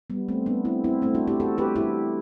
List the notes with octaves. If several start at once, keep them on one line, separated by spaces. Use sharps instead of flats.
G3 B3
A3 C4
B3 D4
C4 E4
C4 E4
A3 C4
D4 F#4
E4 G4
F#4 A4
G4 B4
E4 G4